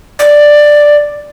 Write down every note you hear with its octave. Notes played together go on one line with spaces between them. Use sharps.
D5